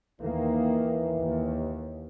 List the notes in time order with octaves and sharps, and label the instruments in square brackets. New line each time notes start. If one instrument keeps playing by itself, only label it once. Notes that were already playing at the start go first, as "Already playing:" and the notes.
[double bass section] D#2 D#3 A#3 [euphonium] E3
[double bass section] D#2